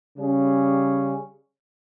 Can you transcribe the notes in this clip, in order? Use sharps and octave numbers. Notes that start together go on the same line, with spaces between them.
C#3 G3 C#4 G#4